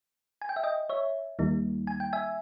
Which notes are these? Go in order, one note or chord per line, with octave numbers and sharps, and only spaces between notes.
G#5
G5
E5
D#5 G5
C#5 E5
D#2 D#3 G3 A#3 D#4
G#5
G5
E5 G#5